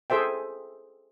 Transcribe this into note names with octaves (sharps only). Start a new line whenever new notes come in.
G#4 A4 C5 E5 G5